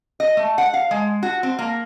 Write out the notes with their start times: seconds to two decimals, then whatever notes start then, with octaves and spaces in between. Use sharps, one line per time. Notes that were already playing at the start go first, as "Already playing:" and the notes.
0.20 D#5
0.37 A3
0.58 F#5
0.74 F5
0.91 G#3
1.23 F#4
1.43 C4
1.59 A#3